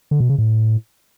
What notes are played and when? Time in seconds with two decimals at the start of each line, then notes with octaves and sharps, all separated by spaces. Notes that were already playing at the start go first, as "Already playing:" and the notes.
0.11 D3
0.20 B2
0.29 C#3
0.38 A2